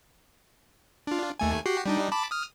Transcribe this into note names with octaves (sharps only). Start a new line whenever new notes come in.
D4 F4
D#2 A3 G#5
F#4 G4 C7
G3 D4 D#4
A5 B5 D6
D#6 F6